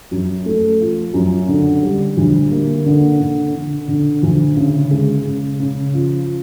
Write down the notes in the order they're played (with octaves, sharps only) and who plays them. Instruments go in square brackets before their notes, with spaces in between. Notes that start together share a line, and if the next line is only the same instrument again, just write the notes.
[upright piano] F#2
A3
F3
F#2
D3
G3
D2
A#3
D3
D3
D3
D3
D2
C#3
G#3
C#3
C#3
F3